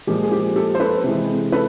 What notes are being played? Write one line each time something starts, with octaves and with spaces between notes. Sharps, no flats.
A#2 F3 G#3 G4
G#4
G4
G4 A4
C5
A4 B4
C3 E3 G#3
A4 B4